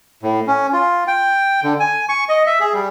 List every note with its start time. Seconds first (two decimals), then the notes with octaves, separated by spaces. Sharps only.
0.23 A2
0.47 C#4
0.73 F4
1.08 G5
1.63 D3
1.80 G#5
2.09 C#6
2.29 D#5
2.47 E5
2.60 G#4
2.73 G3